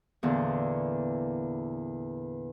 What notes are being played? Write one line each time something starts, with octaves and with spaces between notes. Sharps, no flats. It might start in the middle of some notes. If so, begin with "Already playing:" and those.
E2 A#2 D3